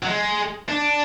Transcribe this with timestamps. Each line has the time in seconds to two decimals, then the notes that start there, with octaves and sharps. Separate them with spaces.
0.03 F#3
0.07 G#3
0.69 D4